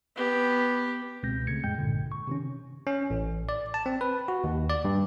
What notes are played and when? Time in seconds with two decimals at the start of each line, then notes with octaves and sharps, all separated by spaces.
0.16 B3 G4
1.23 C#2 B2 G#3 C4 G6 A#6
1.47 C#3 A3 G#6 C#7
1.64 F2 A2 G#3 G5 G6
1.78 A#1 G2 A#2 D3
2.12 C#6
2.27 C3 D#3 C#4
2.87 C#4
3.10 A1
3.49 D5
3.74 A5
3.86 C4
4.01 B4
4.28 F#4
4.44 D#2
4.69 D5
4.85 G2